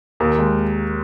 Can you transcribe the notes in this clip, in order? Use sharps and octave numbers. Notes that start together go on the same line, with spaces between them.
D#2 A#4
G#3